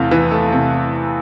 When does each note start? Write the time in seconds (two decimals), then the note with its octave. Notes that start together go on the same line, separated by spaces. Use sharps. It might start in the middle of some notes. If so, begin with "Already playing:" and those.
Already playing: E2 C3 A3 F5
0.11 E3
0.31 A3
0.52 C3